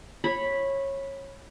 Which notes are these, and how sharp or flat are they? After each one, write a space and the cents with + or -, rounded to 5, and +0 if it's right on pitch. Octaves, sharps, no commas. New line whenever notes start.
C#5 -20 B5 -5